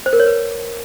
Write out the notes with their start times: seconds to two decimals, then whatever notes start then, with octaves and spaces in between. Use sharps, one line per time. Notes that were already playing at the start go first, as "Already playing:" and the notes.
0.06 C5
0.13 A#4
0.20 C#5
0.26 B4